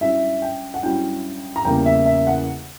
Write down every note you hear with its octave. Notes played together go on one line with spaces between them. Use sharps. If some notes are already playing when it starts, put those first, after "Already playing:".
G2 F#3 C#4 E4 E5
G5
F#5
G2 F#3 C#4 E4 G5
A#5
E2 C#3 G3 A#3 G5
E5
E5
F#5